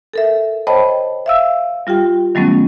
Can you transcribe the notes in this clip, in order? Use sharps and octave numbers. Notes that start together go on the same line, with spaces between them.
A4 A#4 E5
C5 C#5 D#5 G5 A5 B5
E5 F5 E6
G3 F4 G4 G5
D#3 F#3 G3 A3 B3 C#4